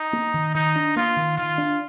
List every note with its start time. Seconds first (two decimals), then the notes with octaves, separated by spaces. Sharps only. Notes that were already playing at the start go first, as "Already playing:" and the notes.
Already playing: D#4
0.13 A#3
0.34 D#3
0.54 D#3 D#4
0.76 D4
0.96 A#3 F4
1.16 D#3
1.37 D#3 F4
1.58 D4